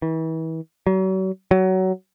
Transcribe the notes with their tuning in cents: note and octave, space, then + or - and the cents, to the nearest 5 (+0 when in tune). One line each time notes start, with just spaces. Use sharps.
E3 -35
F#3 +40
F#3 +20